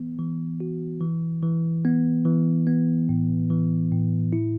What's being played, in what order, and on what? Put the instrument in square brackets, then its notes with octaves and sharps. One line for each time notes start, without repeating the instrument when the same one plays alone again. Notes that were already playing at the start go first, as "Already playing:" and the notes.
Already playing: [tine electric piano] E3 B3
E3
F#4
E3
E3
B3
E3
B3
A2
E3
A2
E4